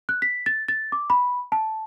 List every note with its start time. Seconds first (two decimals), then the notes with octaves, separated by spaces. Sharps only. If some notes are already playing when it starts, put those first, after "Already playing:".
0.09 F#6
0.22 B6
0.46 A6
0.68 A6
0.92 D6
1.10 B5
1.52 A5